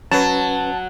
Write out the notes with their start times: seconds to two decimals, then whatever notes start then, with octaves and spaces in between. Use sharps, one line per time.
0.12 F#3 C#4 B4 A5